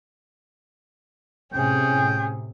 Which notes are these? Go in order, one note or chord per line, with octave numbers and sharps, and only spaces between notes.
A2 C3 C#4 G#4 G5